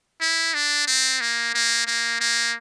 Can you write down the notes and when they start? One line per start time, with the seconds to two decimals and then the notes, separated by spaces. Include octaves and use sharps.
0.21 E4
0.54 D4
0.87 C4
1.21 A#3
1.54 A#3
1.87 A#3
2.20 A#3